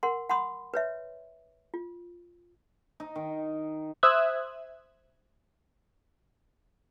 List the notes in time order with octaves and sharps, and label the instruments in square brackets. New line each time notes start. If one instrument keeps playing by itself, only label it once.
[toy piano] A#4 F#5 C6
F#5 B5 C6 D#6
B4 C#5 E5
F4
[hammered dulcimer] D#4
D#3
[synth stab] C5 E5 D#6 E6 F#6 G#6